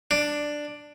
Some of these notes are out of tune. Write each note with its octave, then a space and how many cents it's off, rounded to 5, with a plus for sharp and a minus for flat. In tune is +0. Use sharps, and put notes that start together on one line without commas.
D4 +5